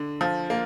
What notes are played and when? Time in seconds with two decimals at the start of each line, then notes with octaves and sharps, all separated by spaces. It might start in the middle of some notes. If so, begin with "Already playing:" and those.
Already playing: D3
0.21 F3
0.50 A#3